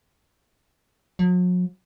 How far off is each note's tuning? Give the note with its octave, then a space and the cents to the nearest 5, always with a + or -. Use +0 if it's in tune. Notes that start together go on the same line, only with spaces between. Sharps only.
F#3 -45